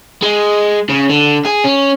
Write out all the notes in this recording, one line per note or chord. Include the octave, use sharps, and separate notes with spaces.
G#3
C#3
D3
G#4
C#4